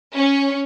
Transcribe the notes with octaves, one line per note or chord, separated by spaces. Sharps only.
C#4